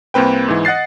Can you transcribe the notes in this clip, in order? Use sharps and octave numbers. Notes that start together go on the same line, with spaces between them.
C2 A#3 C4 B4 G5
G#2 E3
D#5 F#5 F#6 A6 C7